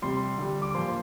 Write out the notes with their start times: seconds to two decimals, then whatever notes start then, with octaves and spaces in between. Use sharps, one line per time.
0.02 C3 G3 C6
0.38 D3 G3
0.62 D6
0.75 A#2 F3 C6